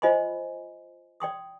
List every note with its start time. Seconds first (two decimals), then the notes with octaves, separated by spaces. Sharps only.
0.02 F4 C5 D#5 G#5 B5 C6
1.20 D5 G5 C6 D#6